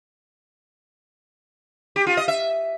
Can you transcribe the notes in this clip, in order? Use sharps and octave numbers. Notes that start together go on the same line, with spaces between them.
G4
F4
D#5
E5